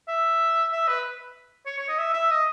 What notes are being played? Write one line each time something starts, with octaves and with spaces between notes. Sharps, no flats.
E5
E5
B4
C#5
C#5
D#5
E5
E5
D#5